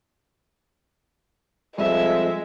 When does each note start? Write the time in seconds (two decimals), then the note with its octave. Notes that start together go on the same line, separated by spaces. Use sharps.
1.78 F2 G3 G#3 E5